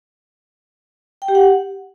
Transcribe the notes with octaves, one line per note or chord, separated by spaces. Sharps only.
G5
G4
F#5